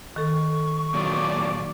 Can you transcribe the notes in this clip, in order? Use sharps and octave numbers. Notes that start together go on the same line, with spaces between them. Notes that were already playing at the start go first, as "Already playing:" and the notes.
D#3 A4 C#6
A#2 F#3 D5